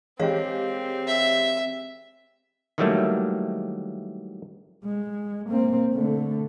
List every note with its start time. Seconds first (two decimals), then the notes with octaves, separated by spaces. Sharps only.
0.19 E3 G#3 C4 G4 C#5 F5
1.07 E5
2.78 D#3 E3 F#3 G3 A3 A#3
4.84 G#3
5.49 A#3 C4
5.94 D3 A3